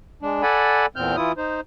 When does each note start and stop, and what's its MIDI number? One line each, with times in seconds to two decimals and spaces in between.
0.23 0.42 56
0.23 0.42 62
0.43 0.86 69
0.43 0.86 74
0.43 0.86 78
0.43 0.86 80
0.43 0.86 83
0.96 1.16 40
0.96 1.16 46
0.96 1.16 60
0.96 1.16 89
0.96 1.16 91
1.16 1.32 52
1.16 1.32 64
1.16 1.32 65
1.16 1.32 87
1.37 1.61 63
1.37 1.61 72